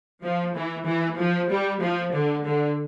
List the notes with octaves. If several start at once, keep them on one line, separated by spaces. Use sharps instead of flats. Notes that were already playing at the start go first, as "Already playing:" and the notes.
F3
E3
E3
F3
G3
F3
D3
D3